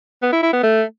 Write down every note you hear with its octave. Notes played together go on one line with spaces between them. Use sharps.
B3
E4
E4
B3
A3